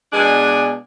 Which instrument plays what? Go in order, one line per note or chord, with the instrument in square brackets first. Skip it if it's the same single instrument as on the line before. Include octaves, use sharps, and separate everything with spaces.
[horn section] B2 G#3 D4 D5 G#5